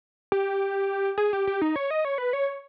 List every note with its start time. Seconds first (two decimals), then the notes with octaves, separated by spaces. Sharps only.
0.32 G4
1.18 G#4
1.33 G4
1.47 G4
1.62 D#4
1.76 C#5
1.91 D#5
2.05 C#5
2.18 B4
2.33 C#5